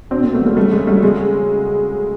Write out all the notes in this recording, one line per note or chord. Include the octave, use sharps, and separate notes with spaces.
B2 C4 D4
A#3 C4
B2
A3 B3
F#3 G#3 A#3
C#3 G3 A3
C#3 G#3
F#3 G3 A3
C#3 G#3